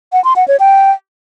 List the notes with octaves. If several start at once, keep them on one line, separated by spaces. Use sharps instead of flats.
F#5
C6
F#5
C#5
G5